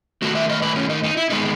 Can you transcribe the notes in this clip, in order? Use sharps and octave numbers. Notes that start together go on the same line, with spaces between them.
D#3 A3 F#4
E5
D#5
B4
C#4
D#4
D#4
E4
D#3 G#3 B3 D#4